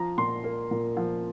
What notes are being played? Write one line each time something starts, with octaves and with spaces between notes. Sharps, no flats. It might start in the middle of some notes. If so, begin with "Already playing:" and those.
Already playing: F3 A#5
A#2 C6
A#3
A#2
F3